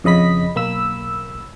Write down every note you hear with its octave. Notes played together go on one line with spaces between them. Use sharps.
F2 C#3 D#5 B5 B6
B1 A#3 B5 E6